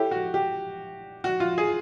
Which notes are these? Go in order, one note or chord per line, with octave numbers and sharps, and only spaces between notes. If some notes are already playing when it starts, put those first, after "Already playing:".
Already playing: E4 G4 A4 C#5 E5
F#4
G4
F#4
F4
G#4